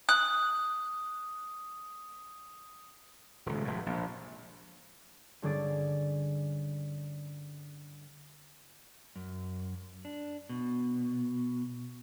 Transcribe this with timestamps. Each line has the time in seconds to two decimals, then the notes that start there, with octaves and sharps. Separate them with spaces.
0.09 D#6 F#6
3.46 D#1 C#2
3.65 F1 A2
3.86 A#1
5.42 G2 D3 C#4 G#4 D6 A6
9.16 F#2
10.05 D4
10.49 B2